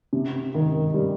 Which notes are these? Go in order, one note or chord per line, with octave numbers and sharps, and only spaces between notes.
C3
D#3
G3